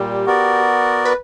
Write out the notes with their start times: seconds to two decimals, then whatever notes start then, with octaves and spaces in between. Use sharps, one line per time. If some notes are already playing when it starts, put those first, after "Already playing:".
Already playing: A#2 G3 G4
0.26 B3 F#4 A#4 D5
1.05 B4